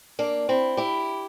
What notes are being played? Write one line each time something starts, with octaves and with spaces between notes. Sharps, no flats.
A#3 D4
C4 E4
E4 G4